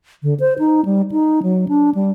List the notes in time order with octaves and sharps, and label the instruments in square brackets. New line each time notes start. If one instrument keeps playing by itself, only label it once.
[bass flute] D3
C5
D#4
G3
D#4
F#3
D4
G3